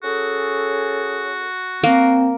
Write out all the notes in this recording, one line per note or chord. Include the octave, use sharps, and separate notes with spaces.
C#4 F#4 G#4 A4
A#3 C4